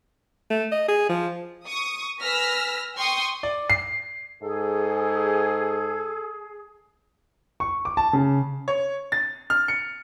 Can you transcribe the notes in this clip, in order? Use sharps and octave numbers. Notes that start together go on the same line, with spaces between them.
A3
D#5
G#4
F3
C#6 D#6
B4 G#5 E6 F6 A#6 B6
G5 C6 C#6 D#6
D5
C7
G#2 G#4 A4
C#6
D6
A5
C#3
C#5
A6
F6
C#7